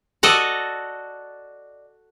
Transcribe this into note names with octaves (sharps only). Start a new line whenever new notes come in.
F#4 A4 D5 D#5